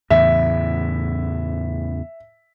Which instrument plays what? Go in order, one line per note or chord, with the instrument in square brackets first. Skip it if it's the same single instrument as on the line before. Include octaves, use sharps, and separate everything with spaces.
[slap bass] E2 A2 C#3 [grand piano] E5